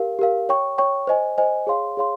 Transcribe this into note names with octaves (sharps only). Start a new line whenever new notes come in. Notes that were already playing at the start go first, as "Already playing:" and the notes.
Already playing: G4 A#4 F5
G4 A#4 F5
C#5 G5 C#6
C#5 G5 C#6
C5 D#5 G#5
C5 D#5 G#5
G#4 C#5 F5 C6
G#4 C#5 F5 C6